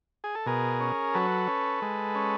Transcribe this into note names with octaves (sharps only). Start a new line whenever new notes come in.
G#4
A4
B2 G#4 A#4
C#4
F#3 A4 B4
C#4
G#3
C#4